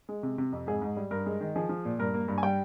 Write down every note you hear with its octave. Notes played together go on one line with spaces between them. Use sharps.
G#3
C3
C3
F2
G#2 G#4
G#2
G3
G2 A#4
G#3
D#3
F3 G#4
F3
A#2
G2 A#4
A#3
G2
G#5
G3 G5